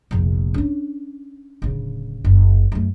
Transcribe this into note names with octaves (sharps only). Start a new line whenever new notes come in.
F1 A#1
C#4 D4
D1 C#3
F#1
F#2 A3